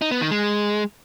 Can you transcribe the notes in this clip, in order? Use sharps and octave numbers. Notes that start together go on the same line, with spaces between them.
D#4
B3
D#3
G#3